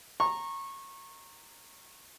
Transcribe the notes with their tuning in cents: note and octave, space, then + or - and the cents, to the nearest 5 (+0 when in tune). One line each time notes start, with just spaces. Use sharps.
A#5 -10 C#6 -25